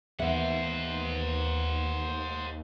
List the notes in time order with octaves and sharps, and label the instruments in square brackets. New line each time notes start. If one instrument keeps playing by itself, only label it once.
[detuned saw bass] D#2 [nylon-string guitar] E3 B3 E5 [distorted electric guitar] C5 F#5